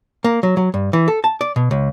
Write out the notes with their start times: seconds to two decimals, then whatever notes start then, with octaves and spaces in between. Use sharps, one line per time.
0.24 A#3
0.43 F#3
0.57 F#3
0.74 G2
0.93 E3
1.08 A4
1.24 A5
1.41 D5
1.56 B2
1.71 C#2